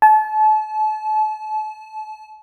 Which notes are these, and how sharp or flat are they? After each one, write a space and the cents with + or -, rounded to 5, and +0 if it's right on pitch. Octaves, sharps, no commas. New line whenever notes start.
A5 -35